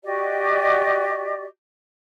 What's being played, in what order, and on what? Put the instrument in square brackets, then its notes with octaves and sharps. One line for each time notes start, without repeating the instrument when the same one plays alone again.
[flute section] F#4 G4 D5 D#5